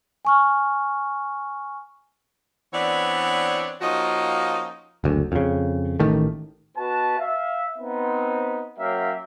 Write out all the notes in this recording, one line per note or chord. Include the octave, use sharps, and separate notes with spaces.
G#5 C#6 F6
E3 B3 C4 D4 C#5 D5
F3 A#3 C#4 D#4 F4 F#4
F#1 D2
F2 C#3
A1 D#3 A3
B2 F#4 B4 A5
E5 F5
B3 C4 D#4
F#3 A#3 C#4 E5 F5 G5